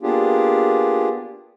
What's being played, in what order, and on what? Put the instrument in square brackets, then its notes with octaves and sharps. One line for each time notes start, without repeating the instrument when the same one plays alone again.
[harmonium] A#3 B3 D4 F4 G4 G#4